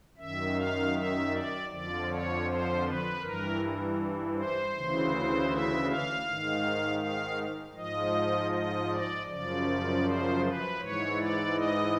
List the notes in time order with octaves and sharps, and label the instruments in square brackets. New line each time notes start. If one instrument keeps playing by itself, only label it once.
[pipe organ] F#2 D#3 E5
F5
E5
D5
F2 D3 F3 D5
C#5
C5
B4
G2 E3 A#4
C5
D2 C#3 E3
E5
F5
G#2 D#3
F5
G#2 F3 D#5
D#5
D5
F#2 C#3 F3 D5
C5
B4
G#2 E3 C#5
D5
D#5